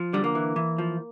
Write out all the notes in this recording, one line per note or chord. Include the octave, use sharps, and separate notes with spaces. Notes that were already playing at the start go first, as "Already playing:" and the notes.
Already playing: F3
D3 G3
A#3
E3
E3
F3